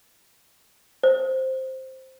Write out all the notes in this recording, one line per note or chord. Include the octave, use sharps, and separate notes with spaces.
C5